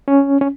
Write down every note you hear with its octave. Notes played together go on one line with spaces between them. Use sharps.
C#4
C#4